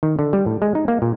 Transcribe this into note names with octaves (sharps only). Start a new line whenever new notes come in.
D#3
D3
G3
A2
G#3
D#4
A#3
A#2